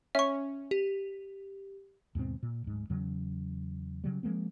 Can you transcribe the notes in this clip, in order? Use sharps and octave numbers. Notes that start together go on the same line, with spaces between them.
C#4 E5 C#6
G4
D#2 G#2 B2 C4
A#2
D1 G#2
E2 C#3 F#3
C#3 F#3 G3
F3 G#3 A#3 C4